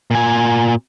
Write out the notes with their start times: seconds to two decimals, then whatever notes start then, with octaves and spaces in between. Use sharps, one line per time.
0.11 A#2 G#5